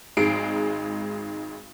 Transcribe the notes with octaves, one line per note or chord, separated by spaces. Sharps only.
G#1 G#3 D#4 C7 D7